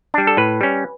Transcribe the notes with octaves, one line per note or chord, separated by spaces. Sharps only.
G3 D4
A4
A2 B4
G3 C#4